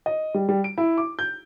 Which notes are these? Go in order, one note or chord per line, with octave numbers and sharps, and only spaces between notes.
D#5
G3
G3
D7
E4
D6
G6